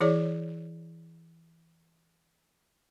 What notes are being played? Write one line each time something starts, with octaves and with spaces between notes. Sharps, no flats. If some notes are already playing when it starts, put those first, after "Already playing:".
E3 E4 G#4 C#5 D5